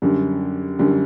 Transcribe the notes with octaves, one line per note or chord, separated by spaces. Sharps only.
F#2 D3 G3
F#2 D3 G3